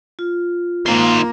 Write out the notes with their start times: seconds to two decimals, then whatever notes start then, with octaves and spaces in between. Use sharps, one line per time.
0.19 F4
0.86 D#3 A#3 C5